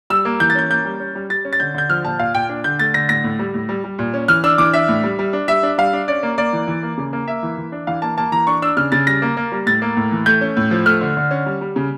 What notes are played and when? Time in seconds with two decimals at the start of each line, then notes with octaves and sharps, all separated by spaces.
0.10 G3 E6
0.25 A#3
0.40 E3 G6
0.50 A6
0.55 C#4 G6
0.70 A#3 G6
0.85 G3
1.00 C#4
1.15 G3
1.30 G3 A6
1.45 C#4
1.53 A6
1.60 D3 G6
1.74 D3 G6
1.90 F3 F6
2.04 A#2 A5
2.19 A#2 F5
2.34 A#2 G5
2.49 D4
2.64 D3 G6
2.79 A3 A6
2.94 D3 A#6
3.09 A2 A#6
3.24 A2
3.39 G3
3.54 A2
3.69 G3
3.84 G3
3.99 A#2
4.14 C#4
4.28 E3 F6
4.44 D4 E6
4.58 E3 D6
4.73 D4 E5
4.89 A2
5.03 G3
5.19 G3
5.33 D4
5.48 G3 E5
5.63 D4
5.78 G3 F5
5.93 D4
6.08 C#4 D5
6.23 A#3
6.38 A#3 D5
6.53 E3
6.67 E3
6.83 A#3
6.98 C#3
7.13 A#3
7.27 A#3 E5
7.43 E3
7.57 E3
7.72 D4
7.87 E3 F5
8.02 A#3 A5
8.17 A#3 A5
8.32 E3 A#5
8.47 D4 C#6
8.62 D4 E6
8.77 C#3 F6
8.92 C#3 A6
9.07 G3 A#6
9.22 A#3
9.37 A#3
9.52 G3
9.66 A2 A6
9.82 A#3
9.97 A2
10.12 E3
10.26 A3 G6
10.41 C#4
10.57 A2
10.71 F3
10.86 A3 F6
11.01 D3
11.17 D3
11.31 C#4
11.46 G3
11.61 G3
11.76 C#3